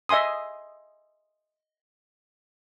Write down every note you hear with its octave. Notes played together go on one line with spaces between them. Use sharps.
D#5 E5 G#5 C6 D#6